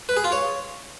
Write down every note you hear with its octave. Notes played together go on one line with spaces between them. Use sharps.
B4
G#4
F4
C#5